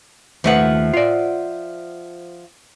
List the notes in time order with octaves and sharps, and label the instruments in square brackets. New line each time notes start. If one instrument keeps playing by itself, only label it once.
[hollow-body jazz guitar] D#2 A3 B4 [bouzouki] F3 E5 F#5
[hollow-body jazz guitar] F4 D5